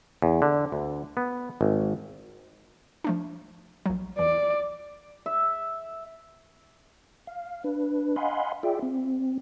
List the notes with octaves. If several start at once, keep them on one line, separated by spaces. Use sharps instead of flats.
E2
D3
D2
B3
G#1
F3 A3 D4
A#1 F#3
E2 E3 D5
E5
F5
D4 B4
D#5 F5 F#5 G#5 B5 C6
F4 G#4 D5 E5 G5
C4